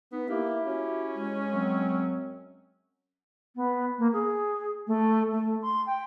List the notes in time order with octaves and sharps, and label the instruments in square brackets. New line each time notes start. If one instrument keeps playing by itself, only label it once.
[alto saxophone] B3 [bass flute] D#4
[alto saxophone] A#3 [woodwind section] E4 G4 [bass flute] E5
[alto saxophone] C#4 [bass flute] F#4
[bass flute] G#3
[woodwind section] F#2 F#3 C4
[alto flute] B3
A#3
G#4
A3
A3
C6
G5